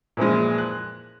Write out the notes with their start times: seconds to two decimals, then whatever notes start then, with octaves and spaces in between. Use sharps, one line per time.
0.17 A#2 E3 F3 G#3
0.58 F#6